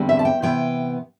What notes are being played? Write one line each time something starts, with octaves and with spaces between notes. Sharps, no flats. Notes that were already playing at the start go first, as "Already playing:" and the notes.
Already playing: E2 D3 G3 C4
E5
A5
G5
C3 E3 B3 G5